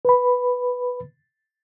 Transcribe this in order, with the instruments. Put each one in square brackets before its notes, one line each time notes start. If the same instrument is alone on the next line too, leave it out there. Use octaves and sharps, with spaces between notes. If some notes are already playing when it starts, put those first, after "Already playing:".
[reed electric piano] B4 B5